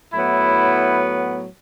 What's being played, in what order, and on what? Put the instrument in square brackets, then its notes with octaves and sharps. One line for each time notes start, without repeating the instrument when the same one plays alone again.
[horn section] A2 F#3 B3 E4